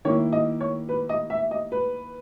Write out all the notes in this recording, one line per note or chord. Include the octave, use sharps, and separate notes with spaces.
D#3 A#3 E4 C#5
D#5
C#5
B4
D#5
E5
D#5
B4